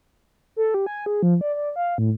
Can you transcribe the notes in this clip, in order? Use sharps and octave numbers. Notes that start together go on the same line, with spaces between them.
A4
G4
G#5
G#4
F3
D5
D5
F5
A2